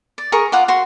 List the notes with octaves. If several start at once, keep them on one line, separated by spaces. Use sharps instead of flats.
D5
G#4 A#4 C#6
F4 F#5 D6
F#4 C6